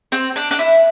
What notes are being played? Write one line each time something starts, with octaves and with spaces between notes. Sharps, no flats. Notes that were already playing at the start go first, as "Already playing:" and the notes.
C4
D4
D4
E4